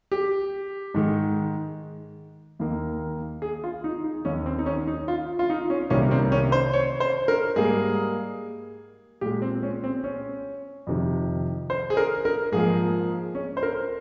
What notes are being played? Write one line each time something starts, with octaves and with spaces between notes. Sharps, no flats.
G4
G#2 D#3 G#3
D#2 D#3 A#3
G#4
F4
D#4
D#4
D#2 D#3 A#3 C#4
C4
D#4
C#4
D#4
F4
F4
D#4
C#4
C2 C3 D#3 A#3 C#4
C4
C#4
C5
C#5
C5
A#4
G#2 G3 A#3 G#4
A#2 G#3 G4
C4
C#4
C4
C#4
F2 C3 D#3
C5
G#4
A#4
A#4
G#2 F3 A#3 G#4
C#4
C5
A#4